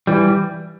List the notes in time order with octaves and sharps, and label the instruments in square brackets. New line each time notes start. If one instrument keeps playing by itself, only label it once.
[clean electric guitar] E3 G3